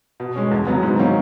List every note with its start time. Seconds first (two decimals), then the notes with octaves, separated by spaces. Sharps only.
0.20 B2
0.36 G#3 C#4
0.51 E2
0.67 C#3 F#3 B3
0.83 G#2
0.99 D#3 F#3 A#3 C#4